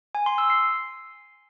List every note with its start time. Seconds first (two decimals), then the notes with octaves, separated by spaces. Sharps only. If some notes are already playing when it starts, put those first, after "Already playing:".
0.15 G#5
0.26 C6
0.38 E6
0.50 C7